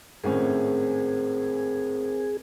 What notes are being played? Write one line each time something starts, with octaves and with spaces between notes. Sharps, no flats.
G#1 A2 C4 C#4 G#4 A#4 C5